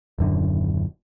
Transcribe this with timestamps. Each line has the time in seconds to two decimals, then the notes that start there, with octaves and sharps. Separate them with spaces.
0.19 D#1 F#2 D3